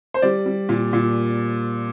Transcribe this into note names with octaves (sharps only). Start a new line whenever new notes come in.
C5
G3 D5
G3
A#2
A#2